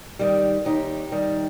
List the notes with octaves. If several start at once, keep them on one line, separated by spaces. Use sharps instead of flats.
D#3 G3
D#2 D#4 G4
D#3 G3